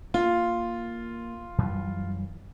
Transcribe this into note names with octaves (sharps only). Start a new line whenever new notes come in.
A#3 F4
F#2 E3 G3